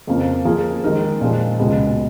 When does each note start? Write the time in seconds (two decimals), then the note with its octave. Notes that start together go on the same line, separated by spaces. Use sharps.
0.07 F2 C#3 F3 A#3
0.45 F3 A#3 F4 G#4
0.83 D#3 G#3 D#4 A#4
1.21 A#2 F3 G#3
1.59 C#2 B2 G#3 B3